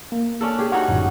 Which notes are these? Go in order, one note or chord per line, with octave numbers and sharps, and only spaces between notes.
A#3
C#4 D4 A4
G4 G#4
D#4 F#4 C#5 F#5
G1 F#2 A2